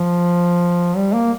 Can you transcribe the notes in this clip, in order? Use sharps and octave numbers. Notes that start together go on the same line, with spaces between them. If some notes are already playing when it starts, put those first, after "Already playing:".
Already playing: F3
G3
A#3